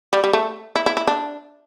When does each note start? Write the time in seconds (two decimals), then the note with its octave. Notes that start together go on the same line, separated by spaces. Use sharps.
0.13 G3
0.24 G3
0.33 A3
0.75 E4
0.86 E4
0.97 E4
1.07 D4